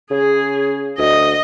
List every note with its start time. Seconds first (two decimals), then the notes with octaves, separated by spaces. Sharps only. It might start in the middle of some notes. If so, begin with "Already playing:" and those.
0.11 C#3 G#4
0.98 D2 D#5